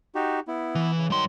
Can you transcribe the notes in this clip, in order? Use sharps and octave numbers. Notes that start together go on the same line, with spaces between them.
D#4 F#4 G4
B3 E4
E3
C#3
G2 D#3 F#3 C6